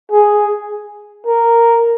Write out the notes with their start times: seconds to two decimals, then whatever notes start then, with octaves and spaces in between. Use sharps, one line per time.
0.11 G#4
1.26 A#4